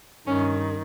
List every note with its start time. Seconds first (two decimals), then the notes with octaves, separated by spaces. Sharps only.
0.26 G2 D#3 C#4